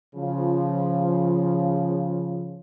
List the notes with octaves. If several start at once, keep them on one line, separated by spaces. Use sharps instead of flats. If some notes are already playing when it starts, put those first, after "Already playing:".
C#3 F3